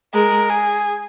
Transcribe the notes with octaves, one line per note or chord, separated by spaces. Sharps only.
G#3 A#4
G#4